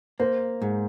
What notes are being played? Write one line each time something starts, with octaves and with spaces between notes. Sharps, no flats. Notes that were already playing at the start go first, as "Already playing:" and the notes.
A#3 C5
G#2